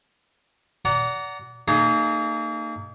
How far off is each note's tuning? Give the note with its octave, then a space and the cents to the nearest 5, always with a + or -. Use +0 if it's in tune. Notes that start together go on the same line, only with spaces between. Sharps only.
D5 -30 F#5 +10 A#5 -15
A#3 -35 D#4 -30 G#4 +20